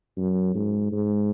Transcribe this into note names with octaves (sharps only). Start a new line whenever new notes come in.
F#2
G#2
G#2